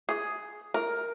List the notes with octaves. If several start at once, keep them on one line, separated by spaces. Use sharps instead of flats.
G#4
A#4